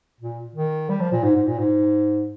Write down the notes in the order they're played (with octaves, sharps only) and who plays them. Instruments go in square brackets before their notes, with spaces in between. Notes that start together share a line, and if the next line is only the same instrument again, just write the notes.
[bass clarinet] A#2
D#3
G3
F3
A#2
G#2
G#2
A#2
G#2